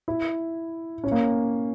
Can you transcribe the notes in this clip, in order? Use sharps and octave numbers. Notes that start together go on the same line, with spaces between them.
E4
C#4
A#3